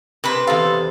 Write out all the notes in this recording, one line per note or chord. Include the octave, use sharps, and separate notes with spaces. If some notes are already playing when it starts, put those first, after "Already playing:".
C3 B4 C5 B5
E2 C3 A4 F5